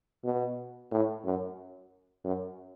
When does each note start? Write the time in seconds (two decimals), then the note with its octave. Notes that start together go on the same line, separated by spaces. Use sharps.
0.24 B2
0.92 A2
1.25 F#2
2.24 F#2